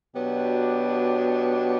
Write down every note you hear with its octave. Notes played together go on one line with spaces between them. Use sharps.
B2 F#3 B3 D4 G4